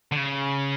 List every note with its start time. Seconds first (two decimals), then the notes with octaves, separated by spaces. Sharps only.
0.12 D3
0.17 C#3